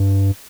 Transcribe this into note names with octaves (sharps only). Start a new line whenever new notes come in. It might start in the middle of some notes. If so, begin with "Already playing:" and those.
Already playing: G2